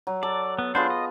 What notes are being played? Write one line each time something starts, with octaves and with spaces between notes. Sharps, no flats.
F#3
A4 D5
B3
B3 D4 F4 G#4 C5
D#5